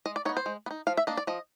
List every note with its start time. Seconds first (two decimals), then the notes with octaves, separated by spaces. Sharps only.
0.06 G#3 D#5
0.16 D5
0.25 D#4 C#5
0.29 B3
0.37 C5
0.46 G#3
0.66 B3
0.71 D#4
0.87 F3 F5
0.97 E5
1.07 A#3 D4 D#5
1.17 D5
1.27 F3 D#5